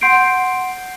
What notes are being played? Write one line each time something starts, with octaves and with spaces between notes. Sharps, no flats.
F#5 C6 G6 C7 D7